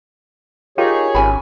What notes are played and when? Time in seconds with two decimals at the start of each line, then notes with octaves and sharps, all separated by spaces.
0.78 D#4 F4 G4 G#4 A#4 C#5
1.15 G#1 C#4 G#5 B5